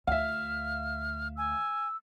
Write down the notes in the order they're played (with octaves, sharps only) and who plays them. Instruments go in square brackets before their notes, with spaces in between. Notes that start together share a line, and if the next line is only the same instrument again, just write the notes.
[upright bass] D2 [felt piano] E5 F5 [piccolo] F6
[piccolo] G#5 [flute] E6